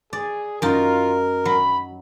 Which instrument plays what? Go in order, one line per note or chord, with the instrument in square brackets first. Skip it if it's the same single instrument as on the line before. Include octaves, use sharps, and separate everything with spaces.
[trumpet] G#4 [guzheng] D5
[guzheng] F#2 D#4 [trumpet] F4 [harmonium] A#4
[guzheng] F#3 [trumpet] B5